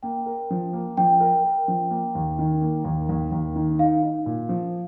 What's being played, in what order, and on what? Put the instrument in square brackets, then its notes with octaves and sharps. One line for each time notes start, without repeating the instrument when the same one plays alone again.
[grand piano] A#3 [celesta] G5
[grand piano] A#4
F3
A#3
[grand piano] F3 [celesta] G5
[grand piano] A#4
A#4
F3
A#3
D#2
D#3
A#3
D#2
D#2
D#2
D#3
[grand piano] D#4 [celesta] F5
[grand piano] D#4
A#2
F3